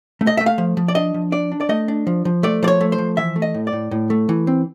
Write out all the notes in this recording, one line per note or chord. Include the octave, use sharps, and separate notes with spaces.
A3
D#5
A3 E5
F5
F3
F3
D5
D4 D#5
F3
D4 D5
D4
D5
A3 D#5
D4
F3
F3
A3 D5
F3 C#5 D5
A3
C5
F3
E3 E5
A3
D#5
A2
D5
A2
A2
A3
E3
C4